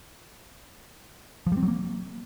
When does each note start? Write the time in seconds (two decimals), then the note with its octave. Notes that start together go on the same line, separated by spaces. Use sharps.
1.47 F3
1.52 G3
1.57 C4
1.63 F#3
1.68 A#3